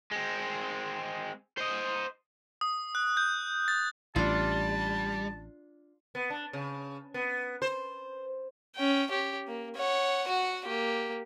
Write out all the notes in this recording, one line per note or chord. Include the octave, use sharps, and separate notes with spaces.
G#3 C4
C5 D#5
D#6
F#6
G6
A6
A1 G3 D4 F4 A5
B3
D4
C#3
B3
C5
C#4 G5
G4 C#5
A#3
C#5 F#5
F#4 F#5
A#3 G4